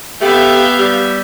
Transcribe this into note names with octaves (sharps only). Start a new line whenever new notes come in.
A3 B3 G4 E5 F5 G6
G3